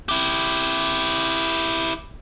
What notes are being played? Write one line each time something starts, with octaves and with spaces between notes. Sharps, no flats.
E4 G4